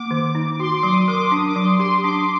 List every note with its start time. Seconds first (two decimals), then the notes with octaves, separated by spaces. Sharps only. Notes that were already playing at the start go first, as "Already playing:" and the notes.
Already playing: A#3 D6
0.11 D#3
0.35 D#4
0.59 F#4 C6
0.77 D6
0.83 F#3 D#6
1.08 A#4 D6
1.32 D4 D#6
1.45 D6
1.56 F#3 C6
1.79 G4 C6
2.04 D4 D6